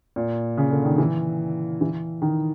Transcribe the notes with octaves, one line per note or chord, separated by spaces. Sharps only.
A#2
C#3
D3
D#3
E3
E3
D#3